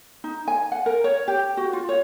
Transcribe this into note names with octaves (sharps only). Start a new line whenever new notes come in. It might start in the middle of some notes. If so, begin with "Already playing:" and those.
D#4
G#5
F#5
A#4
C#5
G4
F#4
F4
C#5